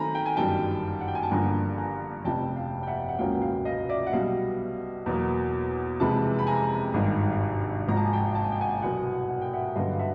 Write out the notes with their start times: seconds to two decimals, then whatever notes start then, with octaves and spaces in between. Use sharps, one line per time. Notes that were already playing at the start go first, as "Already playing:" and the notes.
Already playing: D#3 F#3 A3 C4 G#5 A#5 B5
0.15 G5
0.26 G#5
0.37 G1 F#2 D#3 G3 G5 A5
1.01 F#5
1.08 G5
1.15 G#5
1.23 A5
1.31 G1 G2 D3 F3 A#3 G#5 A#5
1.78 G#5 A#5
2.24 F1 F2 C3 G5 A5
2.56 F5 G5
2.83 G5
2.87 E5 F#5
3.09 F#5
3.19 C#2 B2 F#3 A#3 C#4 F5 G5
3.42 F5 G5
3.65 D#5 F5
3.89 D5 E5
4.07 F#5
4.12 B1 B2 G3 B3 D#5 F5
5.06 E2 B2 F#3 A#3
6.00 F2 C3 E3 G#3 A5 B5
6.39 B5
6.47 G#5 A#5
6.94 G#1 G2 D#3 G3
7.88 G#1 G#2 F3 A#5
7.97 A5
8.05 G#5
8.13 G5 A5
8.35 A5
8.44 G#5
8.52 G5
8.60 F#5 G#5
8.82 C2 B2 F#3 F#5 G#5
9.28 F#5
9.42 G5
9.53 E5 F#5
9.76 G2 D3 F#3 B3 D#5 F5
9.93 F5
9.99 E5 F#5